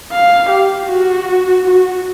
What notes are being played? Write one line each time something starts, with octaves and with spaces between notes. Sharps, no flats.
F5
G4
F#4
F#4